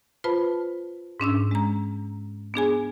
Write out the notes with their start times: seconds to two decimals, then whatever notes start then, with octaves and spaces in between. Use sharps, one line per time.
0.24 F4 B4 C5 A5 B5
1.20 G#2 C#4 D4 E6
1.51 G#3 A#5
2.54 B3 D4 G#4 G#5